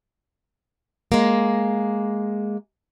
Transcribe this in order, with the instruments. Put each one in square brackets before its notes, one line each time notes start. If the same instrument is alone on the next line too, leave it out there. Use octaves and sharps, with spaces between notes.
[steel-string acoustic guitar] G#3 A#3